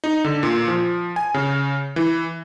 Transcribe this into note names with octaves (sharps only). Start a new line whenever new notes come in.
D#4
D3
A#2
F3
G#5
C#3
E3